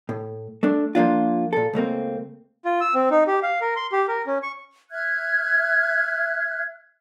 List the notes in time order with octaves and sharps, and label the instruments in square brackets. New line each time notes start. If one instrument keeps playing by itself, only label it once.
[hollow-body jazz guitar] A2
A3 D4
F3 A#3 D4 F4
A#2 A4
C#2 A3 A#3 C4
[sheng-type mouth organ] F4
E6
C4
D#4
G4
F5
A#4
C6
G4
A#4
C#4
C#6
[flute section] E5 F6 F#6 G#6